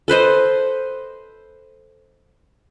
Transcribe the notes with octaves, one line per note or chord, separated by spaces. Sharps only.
A4 B4 C5 D#5